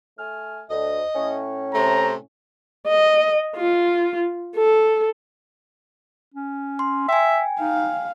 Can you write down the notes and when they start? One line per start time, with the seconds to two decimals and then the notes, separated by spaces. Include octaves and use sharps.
0.18 A3 G#5 F6
0.70 D2 D#5
1.15 A2 C#4
1.74 C3 A3 C5 A#5
2.87 D#5
3.56 F4
4.56 A4
6.34 C#4
6.79 C6
7.09 E5 G5 G#5
7.61 D#4 F5